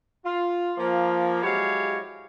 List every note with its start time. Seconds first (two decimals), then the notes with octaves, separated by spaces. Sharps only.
0.24 F4
0.78 F3 A#3
1.43 F#3 G#3 E4 G4 C#5 F5